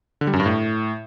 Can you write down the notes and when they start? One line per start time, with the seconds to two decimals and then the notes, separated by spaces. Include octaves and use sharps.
0.21 D3
0.27 G3
0.33 F#2
0.40 G2
0.46 A2